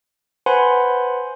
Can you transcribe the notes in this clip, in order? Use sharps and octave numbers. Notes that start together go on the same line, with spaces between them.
B4 C5 F#5 G#5 B5 C6